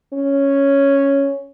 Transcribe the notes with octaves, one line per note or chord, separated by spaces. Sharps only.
C#4